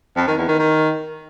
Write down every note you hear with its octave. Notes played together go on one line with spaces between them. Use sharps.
F2
D#3
E2
D#3
D#3